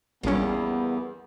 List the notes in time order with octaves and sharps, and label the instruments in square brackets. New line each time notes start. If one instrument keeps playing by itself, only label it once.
[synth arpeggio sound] A#1 C#4 [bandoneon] E2 [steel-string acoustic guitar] G3 A#3 [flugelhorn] B3